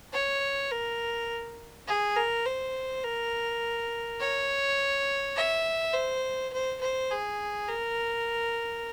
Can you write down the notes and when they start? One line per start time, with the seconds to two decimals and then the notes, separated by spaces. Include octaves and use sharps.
0.13 C#5
0.71 A#4
1.87 G#4
2.16 A#4
2.45 C5
3.04 A#4
4.20 C#5
5.36 E5
5.94 C5
6.53 C5
6.81 C5
7.11 G#4
7.68 A#4